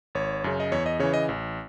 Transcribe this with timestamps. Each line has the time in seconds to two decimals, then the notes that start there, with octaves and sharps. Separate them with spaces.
0.15 G#1 C#5
0.44 F#2 C#3
0.60 D#5
0.72 E2 C#5
0.86 D#5
0.99 C#3 E3 C#5
1.14 D#5
1.29 A1